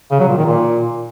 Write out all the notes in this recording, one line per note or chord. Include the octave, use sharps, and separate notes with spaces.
C#3
F#3
A#2
D#3
A#2